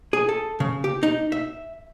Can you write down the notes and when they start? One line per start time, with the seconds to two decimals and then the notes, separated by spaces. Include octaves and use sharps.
0.13 G#4
0.29 A4
0.60 C#3
0.84 G4
1.03 D#4
1.32 E5